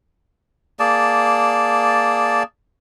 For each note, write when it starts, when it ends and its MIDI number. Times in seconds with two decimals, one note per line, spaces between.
0.79 2.43 58
0.79 2.43 68
0.79 2.43 74
0.79 2.43 81